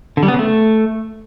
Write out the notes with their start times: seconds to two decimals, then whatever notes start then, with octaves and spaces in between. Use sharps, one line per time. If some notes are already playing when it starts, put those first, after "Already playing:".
0.17 D3
0.23 G3
0.28 B3
0.34 C#3
0.39 A3